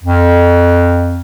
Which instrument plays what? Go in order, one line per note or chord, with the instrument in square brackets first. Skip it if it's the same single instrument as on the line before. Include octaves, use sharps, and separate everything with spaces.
[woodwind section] F2